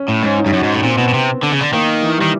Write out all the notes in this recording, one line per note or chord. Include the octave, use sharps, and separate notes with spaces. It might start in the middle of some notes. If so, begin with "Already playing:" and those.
Already playing: C#4
A2
G#2 C#4
D#4
G2
F#2 F#4
G#2
A2
A#2 C4
B2 B3
B2
C3
D3
C#3
D3
D#3 A#3
E3
D#3 G3